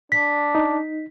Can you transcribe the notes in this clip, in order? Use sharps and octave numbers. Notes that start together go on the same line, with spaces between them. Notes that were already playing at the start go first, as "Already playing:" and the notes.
D4 B6
D#4